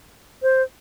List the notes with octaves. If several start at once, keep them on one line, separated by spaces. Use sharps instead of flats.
C5